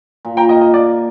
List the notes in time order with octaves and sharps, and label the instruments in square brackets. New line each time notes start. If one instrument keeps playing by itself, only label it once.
[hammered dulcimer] A#2
[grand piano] G5 A#5
[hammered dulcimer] A#3 [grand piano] D#5
[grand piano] D#5
[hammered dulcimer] A#3 [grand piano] D5